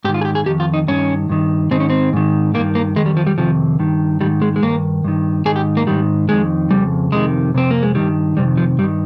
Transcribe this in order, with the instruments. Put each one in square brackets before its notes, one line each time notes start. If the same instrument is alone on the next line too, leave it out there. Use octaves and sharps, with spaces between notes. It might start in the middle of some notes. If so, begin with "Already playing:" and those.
[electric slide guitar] G#2 G4
D#3
F4
G#4
G4
G#4
F2 D#3 G4
F4
D#4
G2 D#3 C#4
G2 D#3
G#2 D#3 C4
C#4
C4
G#2 D#3
D#3 A#3
G2
A#3
F2 D#3 G#3
G3
F3
G3
F2 C3 D#3 F3
G2 D#3
G#2 D#3 G3
G#3
G#3
G2 D#3 A#3
G2 D#3
G#2 D#3 G#4
G4
A#3
G#2 D#3 G3
F2 D#3 G#3
F2 C#3 G3
F2 C3 D#3 G#3
F2 C3 C4
A#3
G#3
G2 D#3 G3
F2 C3 D#3 G3
F3
G2 G3
D#3